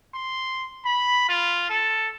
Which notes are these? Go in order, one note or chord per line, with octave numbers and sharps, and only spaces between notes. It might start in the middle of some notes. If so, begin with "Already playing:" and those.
C6
B5
F4
A4